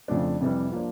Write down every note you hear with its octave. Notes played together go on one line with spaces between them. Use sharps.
F2 C#3 F3 A3 D4
F2 C3 E3 G3
F3 A#3 D4